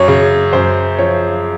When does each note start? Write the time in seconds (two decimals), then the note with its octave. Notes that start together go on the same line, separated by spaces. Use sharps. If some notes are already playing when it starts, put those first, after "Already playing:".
Already playing: F#2 C#5
0.08 C#3
0.53 F#2 C5
0.99 F3 C#5